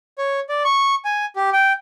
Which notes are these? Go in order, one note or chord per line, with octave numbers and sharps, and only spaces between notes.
C#5
D5
C#6
G#5
G4
G5